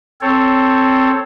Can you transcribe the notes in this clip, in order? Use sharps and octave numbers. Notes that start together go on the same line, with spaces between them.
C4 A4 C#5